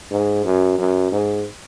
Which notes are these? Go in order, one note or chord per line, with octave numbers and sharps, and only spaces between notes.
G#2
F#2
F#2
G#2